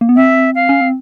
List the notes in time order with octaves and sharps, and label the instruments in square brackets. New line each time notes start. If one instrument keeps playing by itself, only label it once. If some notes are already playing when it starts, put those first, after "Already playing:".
[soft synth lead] A#3
B3
[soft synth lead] C4 [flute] E5
[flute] F5
[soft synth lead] C#4
C4